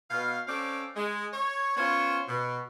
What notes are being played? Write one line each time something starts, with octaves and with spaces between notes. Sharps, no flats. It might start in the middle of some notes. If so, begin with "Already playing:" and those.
B2 F5
C4 C#4 A4 D5 F5 G5
G#3
C#5
B3 C#4 F4 C5 C#5
B2